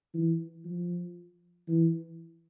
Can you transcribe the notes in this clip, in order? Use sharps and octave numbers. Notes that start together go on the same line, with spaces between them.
E3
F3
E3